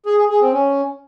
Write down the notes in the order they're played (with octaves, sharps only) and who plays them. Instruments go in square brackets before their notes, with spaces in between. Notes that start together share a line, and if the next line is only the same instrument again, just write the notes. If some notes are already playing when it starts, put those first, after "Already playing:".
[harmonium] G#4
G#4
G#4
C4
C#4